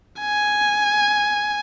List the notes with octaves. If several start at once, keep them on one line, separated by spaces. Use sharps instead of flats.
G#5